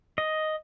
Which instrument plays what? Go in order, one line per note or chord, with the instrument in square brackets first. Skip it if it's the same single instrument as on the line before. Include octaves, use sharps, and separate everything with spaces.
[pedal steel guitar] D#5